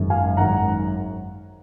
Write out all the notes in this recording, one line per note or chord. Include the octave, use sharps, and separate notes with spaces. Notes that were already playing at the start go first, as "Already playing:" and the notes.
Already playing: G#1 F#2 D#3 G#3
F5 G#5
G#1 F#2 D#3 G#3 F#5 A#5